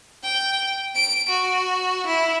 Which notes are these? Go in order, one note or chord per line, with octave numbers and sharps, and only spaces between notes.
G5
D7
F#4
E4